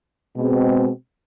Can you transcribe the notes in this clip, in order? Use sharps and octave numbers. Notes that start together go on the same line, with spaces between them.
B2 G#3 C4